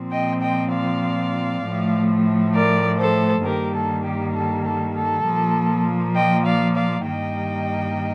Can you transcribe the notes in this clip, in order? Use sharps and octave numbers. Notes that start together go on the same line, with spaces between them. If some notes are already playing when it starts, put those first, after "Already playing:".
Already playing: A#2 F3 C4
D#5 G5
D#5 G5
D5 F5
A2 F3 A3
A#4 D5
A4 C5
G2 D#3 G3 A#3 G4 A#4
A4
G4
A4
A4
A4
A#2 F3 A#3
D#5 G5
D5 F5
D5 F5
G2 D#3 G3 A#3 D#5 G5